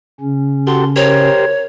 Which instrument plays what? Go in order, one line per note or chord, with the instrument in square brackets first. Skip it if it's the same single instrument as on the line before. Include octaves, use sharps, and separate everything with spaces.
[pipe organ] C#3 C#4
[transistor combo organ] F#4 G4 A4 [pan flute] C6
[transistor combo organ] G4 A#4 C5 [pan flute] C#5